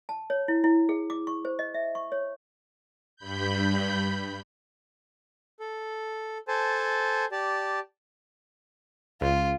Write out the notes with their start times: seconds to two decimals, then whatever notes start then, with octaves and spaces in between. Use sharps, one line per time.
0.09 A5
0.30 C#5
0.48 E4
0.64 E4
0.89 G#4
1.10 D6
1.27 C#6
1.45 C5
1.59 D#5
1.74 E5
1.95 C#6
2.12 C#5
3.17 G2 B5 G6
5.60 A4
6.48 A4 C5 G#5 A5
7.32 G4 D5 A5
9.21 C#2 F4